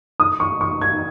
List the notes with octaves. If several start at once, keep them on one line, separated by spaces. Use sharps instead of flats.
D#6
C#6
C#6
G#6